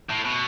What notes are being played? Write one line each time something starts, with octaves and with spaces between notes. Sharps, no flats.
A2
B2